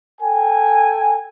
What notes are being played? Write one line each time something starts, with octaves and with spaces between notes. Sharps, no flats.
A4 G5 G#5